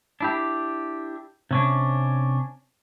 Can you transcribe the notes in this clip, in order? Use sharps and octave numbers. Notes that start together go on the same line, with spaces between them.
D4 E4 G4
C3 C#4 D4